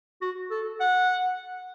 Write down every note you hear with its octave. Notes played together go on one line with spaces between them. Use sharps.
F#4
A4
F#5